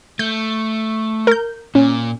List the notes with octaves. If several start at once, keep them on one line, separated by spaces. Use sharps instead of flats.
A3 G6
A#4 G6
A#2 C#4